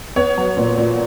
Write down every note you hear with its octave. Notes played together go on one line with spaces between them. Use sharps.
B3 C#5
F#3
A#2
A#2